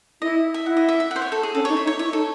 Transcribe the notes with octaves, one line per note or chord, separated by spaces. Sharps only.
E4 D#5
E5
E4 F#5
D#5
E5
E5
C5 F#5
C#5
A4
G#4
C#4 A4
D#4 C#5
E5
D#4
C#5
E4 C#5
D#4 A4